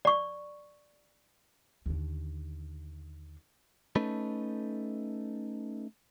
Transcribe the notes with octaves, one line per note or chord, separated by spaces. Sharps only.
D5 C#6
D#2 D3
A3 C#4 D#4 A4 B4